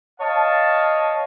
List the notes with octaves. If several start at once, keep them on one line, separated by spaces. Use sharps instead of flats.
C#5 D#5 F5 A5